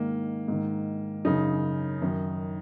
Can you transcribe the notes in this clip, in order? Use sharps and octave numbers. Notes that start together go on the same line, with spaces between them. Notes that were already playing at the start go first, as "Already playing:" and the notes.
Already playing: G#2 D#3 A#3
G#2 D#3
F#2 C#3 D#4
F#2 D#3